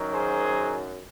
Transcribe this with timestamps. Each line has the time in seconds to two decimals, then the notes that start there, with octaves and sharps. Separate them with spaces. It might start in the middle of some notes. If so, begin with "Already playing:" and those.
Already playing: F#2 D#3 F#3
0.13 G#4 C5